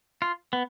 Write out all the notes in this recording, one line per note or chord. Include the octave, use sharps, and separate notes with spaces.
F4
B3